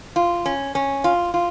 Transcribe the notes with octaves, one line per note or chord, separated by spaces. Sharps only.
F4
C#4
C#4
F4
F4